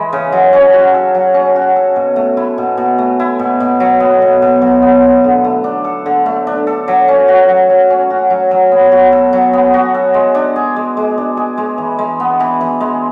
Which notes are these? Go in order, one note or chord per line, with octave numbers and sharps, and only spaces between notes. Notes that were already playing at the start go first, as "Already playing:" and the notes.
Already playing: E3 G#3
C#3
F#3
C#4
F#4
A4
F#3
C#4
F#4
A4
B2
A3
E4
B2
B2
A3
E4
B2
B2
F#3
B3
B2
B2
F#3
B3
B2
D3
A3
D4
A4
D3
A3
D4
A4
F#3
C#4
F#4
F#3
F#3
C#4
F#4
F#3
F#3
B3
F#4
A4
F#3
B3
F#4
A4
G#3
D4
G#4
G#3
G#3
D4
G#4
G#3
E3
G#3
B3
E3
E3
G#3